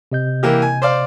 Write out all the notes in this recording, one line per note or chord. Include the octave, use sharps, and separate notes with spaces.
C3 D#5 G6
E3 A#3 G4
G#5
C5 D5 F5